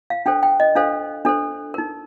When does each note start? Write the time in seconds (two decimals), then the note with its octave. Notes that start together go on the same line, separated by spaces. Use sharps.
0.10 F5
0.26 D4 A4 C5 G5
0.43 G5
0.60 D#5
0.76 D4 A4 C5 F5
1.25 D4 A4 C5
1.74 D#4 A#4